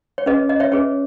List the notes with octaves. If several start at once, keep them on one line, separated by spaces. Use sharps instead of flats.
C#5
C#4 G#4 B4 D#5
D#5
C#5 E5
C#4 G#4 B4 C#5